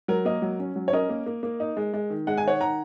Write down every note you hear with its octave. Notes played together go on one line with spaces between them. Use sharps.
F#3 A#4
A#3 A#4 D#5
F#3
C#4
F#3
C#5
C#4 A#4 D#5
A#3
A#3
A#3
D#4
G#3
G#3
D#3
G#3 F#5
G#5
D#3 C#5 F#5
D#3 F#5 A#5